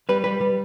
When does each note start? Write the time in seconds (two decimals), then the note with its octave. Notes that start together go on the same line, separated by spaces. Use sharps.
0.09 G3 B4
0.24 G3 B4
0.41 G3